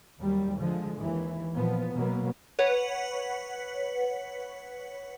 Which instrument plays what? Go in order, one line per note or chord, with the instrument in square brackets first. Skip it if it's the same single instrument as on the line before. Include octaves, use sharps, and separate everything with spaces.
[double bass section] D#2 F#3 G3
D3 F3 G#3
D#2 E3
A#2 F3 B3
B2 F#3 A#3 B3
[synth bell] B4 C#5 F#5